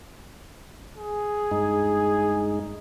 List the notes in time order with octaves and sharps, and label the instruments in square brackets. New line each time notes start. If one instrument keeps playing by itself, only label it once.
[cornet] G#4
[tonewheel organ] G2 G#3 D#4